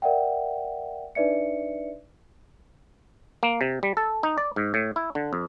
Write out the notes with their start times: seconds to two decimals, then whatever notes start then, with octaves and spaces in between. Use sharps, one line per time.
0.02 A#4 D5 E5 F#5 G5
1.15 D4 D#4 B4 D5 E5 C#7
3.43 A#3
3.61 C3
3.83 G3
3.97 A4
4.23 D#4
4.38 D5
4.56 G#2
4.74 A2
4.96 E4
5.15 D3
5.33 F2